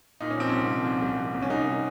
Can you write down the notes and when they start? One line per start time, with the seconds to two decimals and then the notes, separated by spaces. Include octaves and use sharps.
0.20 A#2 D#4
0.30 C#4
0.38 F3 C4
0.49 C2 C#4
0.69 F3
0.86 C2
1.02 C2
1.18 C2
1.34 C2
1.42 C#4
1.50 C2 D#4